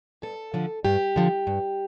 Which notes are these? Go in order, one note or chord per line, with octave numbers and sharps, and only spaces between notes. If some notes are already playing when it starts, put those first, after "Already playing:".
G2 A4
D3 F3
G2 G4
D3 F3
G2